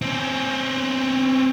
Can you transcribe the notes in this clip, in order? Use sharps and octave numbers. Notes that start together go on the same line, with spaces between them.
C4 C#4